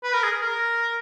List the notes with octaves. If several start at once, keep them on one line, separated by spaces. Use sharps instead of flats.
B4
A#4
G#4
A#4